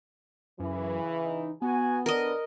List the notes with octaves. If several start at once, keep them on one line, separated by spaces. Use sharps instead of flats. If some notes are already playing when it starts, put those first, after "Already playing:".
F#2 C#3 E3
D#4
B3 F#4 G#5
D3 D4 A#4 D#5